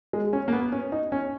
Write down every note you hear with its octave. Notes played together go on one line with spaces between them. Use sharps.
G#3
C#4
A#3
B3
C#4
D#4
C#4